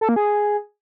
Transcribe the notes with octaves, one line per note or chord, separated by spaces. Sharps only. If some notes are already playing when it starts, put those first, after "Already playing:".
A4
A#3
G#4